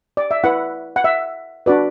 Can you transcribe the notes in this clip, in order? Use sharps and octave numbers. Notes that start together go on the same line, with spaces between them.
D5
E5
E4 B4 F#5
F#5
E5
D4 F#4 B4 D5